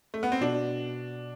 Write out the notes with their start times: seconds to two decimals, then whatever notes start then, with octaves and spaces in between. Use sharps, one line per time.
0.14 A3
0.23 B3
0.32 C4
0.41 B2 D4